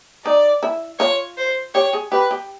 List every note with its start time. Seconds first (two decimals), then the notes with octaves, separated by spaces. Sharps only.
0.25 D#4 D5
0.63 E4
0.99 F4 C#5
1.37 C5
1.75 G4 C#5
1.93 G#4
2.12 G4 B4
2.31 G4